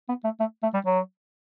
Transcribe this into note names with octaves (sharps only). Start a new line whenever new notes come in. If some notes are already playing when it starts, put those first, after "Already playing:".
B3
A3
A3
A3
G3
F#3